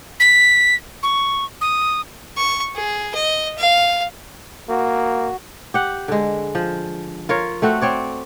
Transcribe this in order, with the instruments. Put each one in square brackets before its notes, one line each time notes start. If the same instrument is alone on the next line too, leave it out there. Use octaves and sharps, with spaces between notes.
[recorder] B6
C#6
D#6
[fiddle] C#6
G#4
D#5
F5
[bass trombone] A#3 [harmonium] F#4
[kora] G4 F#5
D3 G#3
F3
F4 A#4 C#5
A3 C4 F#4
C4 C#5 D5